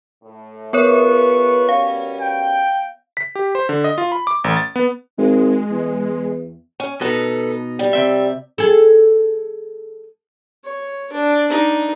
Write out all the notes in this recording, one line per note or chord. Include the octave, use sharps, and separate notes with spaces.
A2
B3 F4 G#4 A#4 B4 C#5 C#6
B2 G3 C#4 F5
G5
B6
G4
C5
D3
D#5
F4
B5
D6
A1
A6
B3
G#1 G#3
E2
C#4
B2 D#4 A4 B4
G3
C3 C4 E5
G#4 A4
C#5
D4
D4 D#4